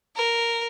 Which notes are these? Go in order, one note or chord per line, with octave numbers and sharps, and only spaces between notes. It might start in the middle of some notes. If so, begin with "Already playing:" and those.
A#4